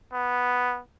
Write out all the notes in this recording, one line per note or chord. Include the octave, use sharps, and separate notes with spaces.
B3